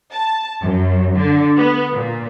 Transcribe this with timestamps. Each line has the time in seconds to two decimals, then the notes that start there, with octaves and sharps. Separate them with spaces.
0.11 A5
0.61 F#2
1.14 D3
1.57 B3
1.92 A#2